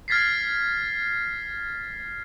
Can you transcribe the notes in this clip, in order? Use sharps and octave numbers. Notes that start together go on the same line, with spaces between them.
F6 G#6 A6 B6 C7